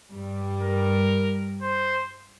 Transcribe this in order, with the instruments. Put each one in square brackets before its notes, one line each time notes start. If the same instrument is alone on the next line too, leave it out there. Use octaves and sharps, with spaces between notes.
[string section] G2 G3
[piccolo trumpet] A#4
C5